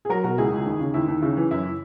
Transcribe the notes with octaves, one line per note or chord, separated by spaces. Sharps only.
G#4
F#3 F#4 A#4
B2 F#4 A#4
C#2 E4 G#4
C#2
D#2
C#3
D#2 E4
D#2
C#3 E4
E3
F#2 E4